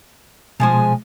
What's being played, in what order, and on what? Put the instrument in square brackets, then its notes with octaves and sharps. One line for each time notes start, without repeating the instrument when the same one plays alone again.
[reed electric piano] B2 [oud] F3 G#3 C5 [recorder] G#5